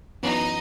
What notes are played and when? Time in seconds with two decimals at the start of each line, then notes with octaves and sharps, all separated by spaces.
0.23 F#2 E3 B3 D#4